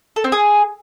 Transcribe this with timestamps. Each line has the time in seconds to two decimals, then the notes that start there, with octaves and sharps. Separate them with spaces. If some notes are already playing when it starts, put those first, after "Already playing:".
0.16 A4
0.24 C4
0.32 G#4